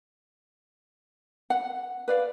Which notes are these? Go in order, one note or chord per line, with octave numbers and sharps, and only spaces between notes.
F#5
B4 D5 F5